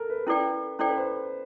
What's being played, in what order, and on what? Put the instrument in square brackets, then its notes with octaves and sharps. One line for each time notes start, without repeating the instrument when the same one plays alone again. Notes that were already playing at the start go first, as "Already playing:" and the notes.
Already playing: [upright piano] A4 A#4
B4
[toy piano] C#4 E4 A4 D5 G5 [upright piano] B4
[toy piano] C#4 E4 A4 D5 G5 [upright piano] C5
[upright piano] B4
C5